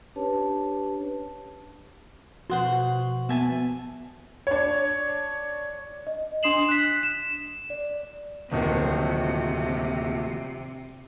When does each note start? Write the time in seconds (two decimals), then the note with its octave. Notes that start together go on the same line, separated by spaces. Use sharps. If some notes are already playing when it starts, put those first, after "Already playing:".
0.16 C#4 D4 G4 B4 C#5 A5
2.50 B2 F3 F#4 C5 F#5 C6
3.29 B3 E5 G#5 A5
4.47 D4 C#5
6.07 D#5
6.43 D4 C6 D#6 C7 E7 F#7
6.69 F#6 B6
7.03 E7
7.70 D5
8.52 D1 D#2 C3 D#3 F3